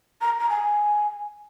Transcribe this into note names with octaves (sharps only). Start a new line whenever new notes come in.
A#5
A#5
G#5